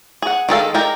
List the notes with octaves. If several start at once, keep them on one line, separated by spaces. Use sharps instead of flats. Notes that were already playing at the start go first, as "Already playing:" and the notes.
G#4 F#5
D#3 G#3 A4 F5
G#3 A#4 D5 G5 A#5